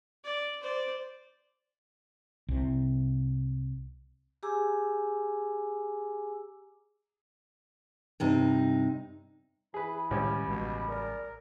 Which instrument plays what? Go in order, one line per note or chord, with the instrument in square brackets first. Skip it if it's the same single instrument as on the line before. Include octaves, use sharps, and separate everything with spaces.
[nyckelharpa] D5
C5 D5
[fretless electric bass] C2 C3
[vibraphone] G4 G#4 G#5 A#5 D6 E6
[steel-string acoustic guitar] G2 C3 D#4
[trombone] E3 [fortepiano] G#4 B4 [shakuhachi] B5
[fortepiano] C#2 G3 C#4 [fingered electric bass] A2 D#3
[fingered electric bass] A1 G#3 [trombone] B2
[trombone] A#4 [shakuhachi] D5